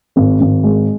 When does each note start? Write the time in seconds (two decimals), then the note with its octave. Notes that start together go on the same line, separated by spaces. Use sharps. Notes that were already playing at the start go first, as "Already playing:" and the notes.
0.16 G#1
0.40 G#1
0.64 G#3